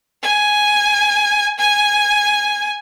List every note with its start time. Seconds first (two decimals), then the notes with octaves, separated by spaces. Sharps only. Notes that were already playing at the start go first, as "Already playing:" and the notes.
0.22 G#5
1.58 G#5